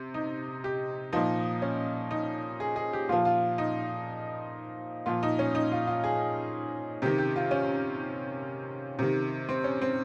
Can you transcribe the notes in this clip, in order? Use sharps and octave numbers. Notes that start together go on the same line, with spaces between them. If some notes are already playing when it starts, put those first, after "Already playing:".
Already playing: C3
D#4
G4
A#2 F3 D#4
C#4
D#4
G#4
G#4
G4
A#2 F3 F4
F4
D#4
A#2 F3 F4
D#4
C#4
D#4
F4
F4
G#4
C3 D#3 G4
G4
F4
C#4
C3 D#3
C4
C#4
C4